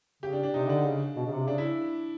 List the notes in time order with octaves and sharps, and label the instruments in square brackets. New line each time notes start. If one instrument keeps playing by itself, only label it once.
[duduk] C#3 [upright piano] G4
[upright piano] D4
D4
[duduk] C3 [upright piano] D#4
[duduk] D3 [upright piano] D4
[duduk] C#3
B2
C#3
C3
[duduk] C#3 [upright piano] D4
[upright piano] E4